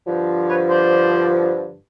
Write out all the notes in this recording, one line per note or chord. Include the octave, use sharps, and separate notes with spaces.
G2 D3 F3
B4 C#5
C5 D5